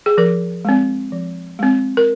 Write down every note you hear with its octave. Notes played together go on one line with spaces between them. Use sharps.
G#4
F3 A#4
G#3 C4
F3
G#3 C4
A#4